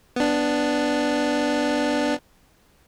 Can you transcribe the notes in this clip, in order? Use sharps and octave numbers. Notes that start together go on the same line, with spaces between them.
B3 D4